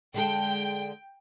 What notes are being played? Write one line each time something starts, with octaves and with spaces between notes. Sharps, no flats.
D3 G#3 A4 G5